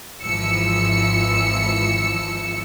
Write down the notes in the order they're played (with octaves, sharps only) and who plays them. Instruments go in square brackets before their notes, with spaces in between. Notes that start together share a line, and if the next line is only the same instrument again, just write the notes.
[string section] G#1 E3 F3 E6 C#7